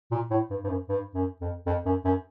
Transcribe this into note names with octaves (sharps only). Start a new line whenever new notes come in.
A#2
A2
G2
G2
F#2
G2
F#2
F2
F2
F#2
F#2